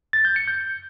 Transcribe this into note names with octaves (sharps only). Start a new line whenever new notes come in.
A6
G6
C#7
G6